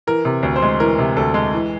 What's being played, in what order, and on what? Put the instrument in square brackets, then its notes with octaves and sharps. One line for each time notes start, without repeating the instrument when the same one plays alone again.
[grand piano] E3 A#4
C3
D2
C5
G#3
E3 A#4
C3
D2 A4
G#3
E3